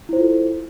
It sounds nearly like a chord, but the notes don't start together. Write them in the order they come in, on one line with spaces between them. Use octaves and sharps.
E4 C5 F4 A4